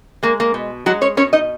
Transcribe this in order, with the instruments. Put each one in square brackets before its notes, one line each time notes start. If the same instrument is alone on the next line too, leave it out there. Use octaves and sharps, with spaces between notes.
[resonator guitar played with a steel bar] G#3 A#3
A#3
B2
F#3 G#3 F#4
C#4 C#5
B2 C#4 C#5
D#4 D#5